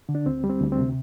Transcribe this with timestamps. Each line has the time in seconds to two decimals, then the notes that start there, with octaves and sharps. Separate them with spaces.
0.09 D3
0.15 D4
0.26 D2 C4
0.44 G3
0.49 C4
0.60 D2
0.72 C4
0.79 C3